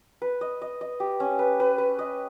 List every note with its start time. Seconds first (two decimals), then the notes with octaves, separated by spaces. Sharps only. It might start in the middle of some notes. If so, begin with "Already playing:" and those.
0.22 B4
0.41 D#5
0.62 D#5
0.81 D#5
1.00 G4
1.20 C#4
1.39 B4
1.60 B4
1.78 B4
1.99 D#5